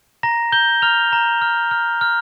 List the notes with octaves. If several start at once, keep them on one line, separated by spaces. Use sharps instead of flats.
A#5 A#6
A#5 G6 G7
A#5 F6 F7
A#5
F6
F6
F6